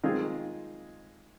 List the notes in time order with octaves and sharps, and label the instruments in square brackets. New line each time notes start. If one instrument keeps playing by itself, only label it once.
[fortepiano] D#3 G#3 C4 F4 G#4